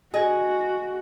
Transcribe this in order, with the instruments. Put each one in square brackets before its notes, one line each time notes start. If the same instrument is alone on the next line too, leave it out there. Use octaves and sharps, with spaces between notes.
[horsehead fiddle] F#4 [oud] G#4 [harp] D#5 G#5